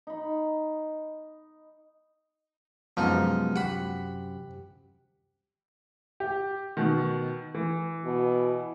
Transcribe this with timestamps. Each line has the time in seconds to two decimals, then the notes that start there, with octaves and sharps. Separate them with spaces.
0.07 D#4 B5
2.97 F#2 C3 F3 G#3 B3 D#4
3.56 G4 F#5 B5
6.20 G4
6.77 B2 D#3
7.55 E3
8.05 B2